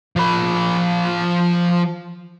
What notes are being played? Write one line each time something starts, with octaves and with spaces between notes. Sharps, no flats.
F3 B5